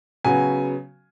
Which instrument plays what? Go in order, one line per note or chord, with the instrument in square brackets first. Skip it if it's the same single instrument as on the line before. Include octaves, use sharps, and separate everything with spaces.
[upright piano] C#3 F#3 B3 G#5